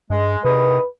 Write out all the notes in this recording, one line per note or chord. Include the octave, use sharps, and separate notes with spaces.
G2 G#3
E2 C3 D#3 B4 D#6